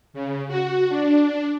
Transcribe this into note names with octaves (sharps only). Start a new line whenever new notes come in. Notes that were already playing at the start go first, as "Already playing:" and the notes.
C#3
F#4
D4